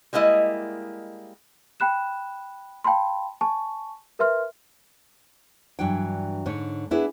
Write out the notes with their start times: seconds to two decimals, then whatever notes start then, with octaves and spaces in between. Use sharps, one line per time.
0.13 G3 G#3 A#3 E4 D#5
1.80 G5 B5 F#6 E7
2.84 F5 G5 A5 B5 C6
3.41 G#5 A5 C#6
4.19 A#4 B4 E5 C6 F6
5.79 G2 E3 F#3 D4 G5
6.46 G#2 D3 C#5
6.91 B3 D4 E4 G#4 B4